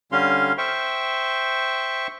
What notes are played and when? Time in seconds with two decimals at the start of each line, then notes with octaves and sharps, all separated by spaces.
0.12 D3 G3 C#4 F5 C6
0.58 C5 E5 G5 C#6